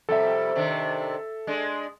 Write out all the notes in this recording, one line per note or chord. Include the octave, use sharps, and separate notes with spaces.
F2 C3 G3 A4 E5
C3 D#3 D4
G#3 D4